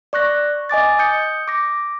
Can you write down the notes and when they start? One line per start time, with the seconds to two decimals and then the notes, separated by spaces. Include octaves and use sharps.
0.13 D5 C#6 F#6 A#6
0.69 D#5 G#5 D6 A6
0.99 D#6 G6 C#7
1.48 D6 A#6